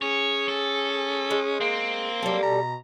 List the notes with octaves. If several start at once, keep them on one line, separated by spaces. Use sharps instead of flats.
C#4 G#4 C#5
A4
G#3
A#3 C4
F#3 G3 A4
B2 A#5